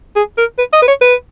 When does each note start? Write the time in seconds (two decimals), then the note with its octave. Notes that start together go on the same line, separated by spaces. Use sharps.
0.16 G#4
0.38 A#4
0.58 B4
0.73 D#5
0.82 B4
0.88 C#5
1.02 B4